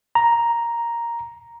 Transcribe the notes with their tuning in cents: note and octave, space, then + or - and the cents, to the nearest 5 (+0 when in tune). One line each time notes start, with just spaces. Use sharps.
A#5 +5